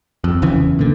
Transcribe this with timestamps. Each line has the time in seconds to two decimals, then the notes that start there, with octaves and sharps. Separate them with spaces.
0.24 F2
0.42 F#1 E2 C#3 E3
0.79 A#2 D3